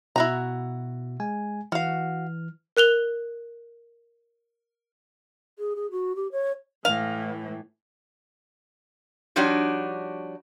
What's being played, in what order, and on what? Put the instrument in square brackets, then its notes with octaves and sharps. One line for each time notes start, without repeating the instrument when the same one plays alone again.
[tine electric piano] B2 [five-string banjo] E4 F#4 A#5
[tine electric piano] G#3 G#5
[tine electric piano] E3 F6 [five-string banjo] F#4 F5
[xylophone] A#4 F#6 F7 G7
[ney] G#4
G#4
F#4
G4
C#5
[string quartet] A2 E3 [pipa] F5
[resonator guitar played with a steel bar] F3 G3 D4 D#4 F#4 C#5